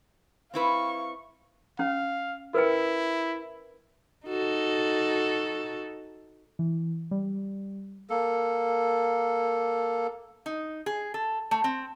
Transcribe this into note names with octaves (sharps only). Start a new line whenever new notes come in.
C4 E4 B4 F5 C#6
C#4 F5
E4 A#4 B4 G5
D#4 F#4 A4
E3
G3
A#3 A4
D#4
G#4
A4
A3
C4